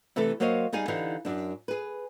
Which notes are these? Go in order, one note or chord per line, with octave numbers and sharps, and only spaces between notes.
C3 E3 A3 A4
F#3 A#3 C5 C#5 D#5 F5
G3 D#4 G#4 F5 G#5
D3 E3 D#4 E4 G4 F5
F#2 D4
G#4 B4